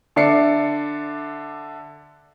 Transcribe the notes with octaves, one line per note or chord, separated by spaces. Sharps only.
D3 D5 E5 C7 C#7